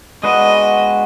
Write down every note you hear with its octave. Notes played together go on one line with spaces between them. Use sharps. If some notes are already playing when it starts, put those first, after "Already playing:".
G#3 B3 D4 F#4 B4 D#5